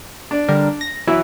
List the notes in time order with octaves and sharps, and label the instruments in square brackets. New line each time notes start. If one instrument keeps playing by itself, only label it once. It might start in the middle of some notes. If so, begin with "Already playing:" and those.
[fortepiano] D4 D5
[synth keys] D3 G3 A#4
A#6
[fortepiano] E3 F#3 E5 [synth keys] E4